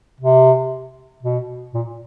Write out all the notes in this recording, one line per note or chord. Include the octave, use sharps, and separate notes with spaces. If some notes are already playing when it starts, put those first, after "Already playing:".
C3
B2
A#2